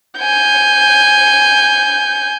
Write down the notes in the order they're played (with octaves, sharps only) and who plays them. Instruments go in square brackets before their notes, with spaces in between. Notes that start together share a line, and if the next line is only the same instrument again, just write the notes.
[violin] G#5 G6